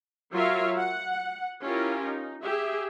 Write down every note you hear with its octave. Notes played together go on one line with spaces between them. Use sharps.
F#3 F4 A#4 C#5 E5 F5
F#5
C#4 E4 F4 G4 A#4
D#4
G4 G#4 E5